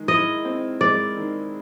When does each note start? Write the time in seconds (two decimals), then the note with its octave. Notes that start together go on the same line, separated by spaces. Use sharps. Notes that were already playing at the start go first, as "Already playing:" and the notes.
Already playing: D#3 G#3
0.08 E4 D#5
0.45 C4
0.81 G#3 D5
1.17 D#3